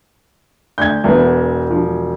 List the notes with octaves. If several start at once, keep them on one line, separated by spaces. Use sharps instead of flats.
D2 G6 G#6
E1 E2 B3
F3